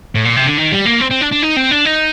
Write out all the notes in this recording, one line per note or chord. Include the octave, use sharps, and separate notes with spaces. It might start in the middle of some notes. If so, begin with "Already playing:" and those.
A2
A#2
C3
D3
D#3
G3
A#3
C4
C4
D4
D4
D#4
C4
D4
D#4